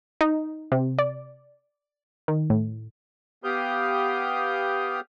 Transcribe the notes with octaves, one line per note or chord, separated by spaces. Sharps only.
D#4
C3
D5
D#3
A2
B3 G4 F5 D#6 G6